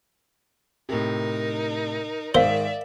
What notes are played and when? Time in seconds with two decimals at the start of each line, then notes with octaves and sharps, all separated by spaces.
0.89 A2 C3 D#4 A#4
2.35 G#2 D#3 A#4 C5 D5 E5 F5